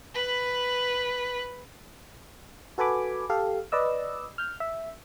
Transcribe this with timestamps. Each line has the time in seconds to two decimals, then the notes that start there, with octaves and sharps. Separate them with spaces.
0.14 B4 B5
2.78 F#4 A4 B4 G#5 B5 D6
3.30 G4 A4 F5
3.72 B4 D5 D#5 E6
4.38 F6 G6
4.60 E5